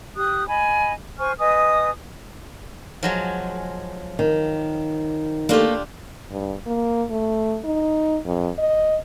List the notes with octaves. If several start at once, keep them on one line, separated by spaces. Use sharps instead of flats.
G4 D#6 F#6
D#5 G#5 B5
C5 G#5 C#6 F6
B4 D#5 G#5 D#6
F3 F#3 G#3
D#3
A3 A#3 D4 F4 G4
G2
A#3
A3
D#4
F2
D#5